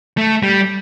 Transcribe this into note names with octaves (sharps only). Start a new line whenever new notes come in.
A3
G3